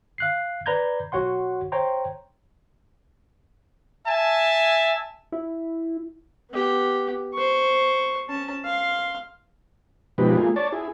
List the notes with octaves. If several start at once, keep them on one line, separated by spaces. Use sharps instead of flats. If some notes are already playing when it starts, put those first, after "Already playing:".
F5 F#6 C7
B4 D5 A#5 B5 G6 G#6
B1 F#4 C#5 F#5 C6
C5 C#5 G5 A#5 C6
E5 G#5 A5
E4
B3 G4
C5 C#6
C#4 A5
F5 C6
B2 F3 G#3 D#4 G4 B4
A3 A#3 F4 G#4
C#5 D5 A5
E4 G#4